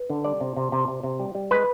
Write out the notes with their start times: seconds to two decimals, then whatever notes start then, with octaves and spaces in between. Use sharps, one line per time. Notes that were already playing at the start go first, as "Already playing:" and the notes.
Already playing: B4
0.10 D3
0.24 G3 D5
0.41 C3
0.56 C3
0.72 C3
0.88 C3
1.03 C3
1.20 G3
1.35 G3
1.51 G#3 B4